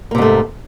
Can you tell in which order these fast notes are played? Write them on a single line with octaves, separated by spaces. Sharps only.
A#3 C3 G#2 A3